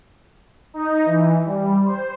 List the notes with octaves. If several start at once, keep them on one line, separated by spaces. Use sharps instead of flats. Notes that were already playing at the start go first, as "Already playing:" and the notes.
D#4
E3
G3
C5